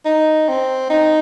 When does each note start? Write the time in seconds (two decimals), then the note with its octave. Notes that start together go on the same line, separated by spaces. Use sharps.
0.05 D#4
0.48 C4
0.90 D#4